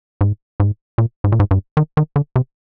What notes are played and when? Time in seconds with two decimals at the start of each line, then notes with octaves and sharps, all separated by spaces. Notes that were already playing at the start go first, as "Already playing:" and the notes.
0.21 G#2
0.60 G#2
0.98 A#2
1.24 G#2
1.32 A#2
1.40 G#2
1.51 G2
1.77 D#3
1.97 D#3
2.16 D3
2.36 C3